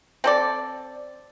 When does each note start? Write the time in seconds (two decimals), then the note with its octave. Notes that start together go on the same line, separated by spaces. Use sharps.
0.24 C4 A4 D5